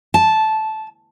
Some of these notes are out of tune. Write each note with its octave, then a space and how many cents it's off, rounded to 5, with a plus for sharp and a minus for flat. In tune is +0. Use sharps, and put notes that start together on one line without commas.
A5 -10